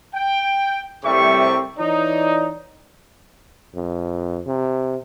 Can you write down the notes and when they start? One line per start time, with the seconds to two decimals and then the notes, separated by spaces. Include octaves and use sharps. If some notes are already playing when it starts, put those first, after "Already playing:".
0.14 G5
1.04 C2 A2 C3 G3 E5 C#6
1.78 E3 D#4 C#5 D5
3.75 F2
4.47 C3